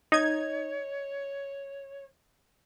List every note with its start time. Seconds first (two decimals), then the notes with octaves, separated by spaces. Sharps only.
0.12 D#4 C#5 D#5 G#6